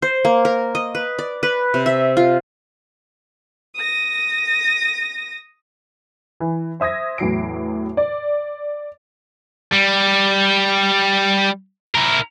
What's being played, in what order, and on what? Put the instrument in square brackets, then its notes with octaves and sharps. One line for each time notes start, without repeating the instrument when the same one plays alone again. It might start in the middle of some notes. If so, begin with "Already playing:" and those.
[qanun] C5
A#3
A#4
D#5
B4
D5
B4
C3
E5
F4
[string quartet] D#6 A#6
[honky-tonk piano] E3
C5 E5 D#6 G#6 A#6
E2 A2 F#3 C7 D7
D5
[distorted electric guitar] G3
E4 A#4